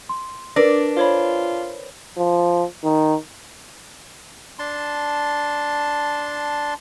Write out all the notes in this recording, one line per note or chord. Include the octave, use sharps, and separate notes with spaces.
C6
D4 A#4 B4 D5 A#6
F4 C5 C#5 B5
F3
D#3
D4 A5 C6